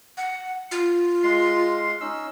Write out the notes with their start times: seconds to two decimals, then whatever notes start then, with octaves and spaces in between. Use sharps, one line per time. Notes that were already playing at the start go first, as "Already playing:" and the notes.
0.17 F#5
0.71 F4
1.23 G#3 F5 C6
2.01 C#4 D#4 E6